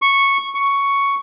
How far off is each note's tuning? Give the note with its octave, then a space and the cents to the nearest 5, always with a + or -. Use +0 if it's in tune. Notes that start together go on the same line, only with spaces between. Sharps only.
C#6 -5
C#6 +5